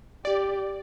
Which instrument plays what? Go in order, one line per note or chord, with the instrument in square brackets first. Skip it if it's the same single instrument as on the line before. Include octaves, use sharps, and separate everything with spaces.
[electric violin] G4 [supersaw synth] D5